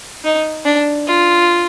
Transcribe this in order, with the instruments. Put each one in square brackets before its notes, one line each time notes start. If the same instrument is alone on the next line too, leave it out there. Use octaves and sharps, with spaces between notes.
[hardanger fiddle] D#4
D4
F4